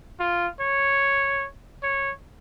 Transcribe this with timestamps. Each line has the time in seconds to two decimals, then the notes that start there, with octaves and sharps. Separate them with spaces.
0.20 F4
0.61 C#5
1.83 C#5